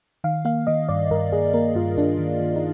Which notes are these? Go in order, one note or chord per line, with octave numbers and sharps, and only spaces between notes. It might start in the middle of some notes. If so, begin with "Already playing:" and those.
D#3 F5
A#3 F5
D#3 D#5
G2 D5
G2 A#4
G2 G#4
A#3 A#4
G2 F4
G2 D4
D#3
D#3
D#4